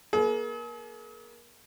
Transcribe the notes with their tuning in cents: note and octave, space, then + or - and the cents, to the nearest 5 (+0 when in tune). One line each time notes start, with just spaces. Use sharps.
A#3 +30 G#4 +45